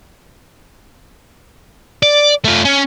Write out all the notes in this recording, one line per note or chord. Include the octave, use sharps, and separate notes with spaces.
D5
A3 F4
C#4